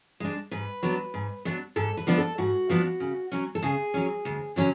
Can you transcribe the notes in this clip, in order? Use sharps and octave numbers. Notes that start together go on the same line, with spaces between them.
G#3 D4
G#2 B4
F#3 B3 D4
G#2
F#3 B3 D4
G#2 A4
B4
F3 B3 D4
A4
G#2 F#4
F3 B3 D4
C#3
F#3 C#4
A4
C#3 G#4
F#3 C#4
D2
D3 F#3 C#4